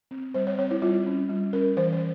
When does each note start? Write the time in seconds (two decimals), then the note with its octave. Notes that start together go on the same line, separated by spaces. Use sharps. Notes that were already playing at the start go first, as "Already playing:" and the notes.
0.11 C4
0.34 G3 C5
0.47 C#5
0.59 C4 C#5
0.71 E4
0.82 G3 F4
1.07 C#4
1.29 G3
1.53 C#4 A#4
1.77 E3 C5
1.93 C5